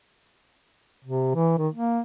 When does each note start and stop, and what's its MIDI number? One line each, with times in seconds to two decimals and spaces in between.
1.05 1.33 48
1.35 1.56 52
1.58 1.68 51
1.74 2.01 58